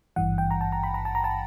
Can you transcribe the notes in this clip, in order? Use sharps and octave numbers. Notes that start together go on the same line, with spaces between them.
G#1 G2 E3 F#5
G5
A#5
A5
A#5
B5
A#5
A5
A#5
A5